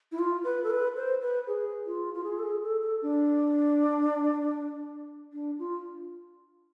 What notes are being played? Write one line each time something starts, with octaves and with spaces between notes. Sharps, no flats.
E4
F4
B4
A4
B4
C5
B4
G#4
F4
F4
G#4
A4
G#4
A4
A4
D4
D4
F4